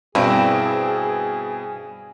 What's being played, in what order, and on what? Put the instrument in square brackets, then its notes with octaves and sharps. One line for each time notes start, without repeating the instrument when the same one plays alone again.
[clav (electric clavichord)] G2 [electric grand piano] B2 E4 [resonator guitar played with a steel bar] C4 [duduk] G#4